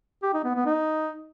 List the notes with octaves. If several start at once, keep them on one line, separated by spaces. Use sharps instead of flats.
G4
D#4
B3
B3
D#4